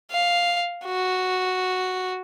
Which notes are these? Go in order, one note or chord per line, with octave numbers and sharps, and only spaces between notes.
F5
F#4